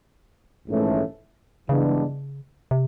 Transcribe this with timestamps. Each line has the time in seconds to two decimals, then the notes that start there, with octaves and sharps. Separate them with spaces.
0.67 A#1 G#2 E3 A3 C#4
1.69 G2 C#3 E3 G#3 B3 D4
2.71 C3